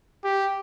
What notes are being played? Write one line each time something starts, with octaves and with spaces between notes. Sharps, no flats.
G4